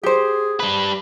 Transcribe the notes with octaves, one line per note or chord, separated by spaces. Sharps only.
G4 G#4 C5
G3 B4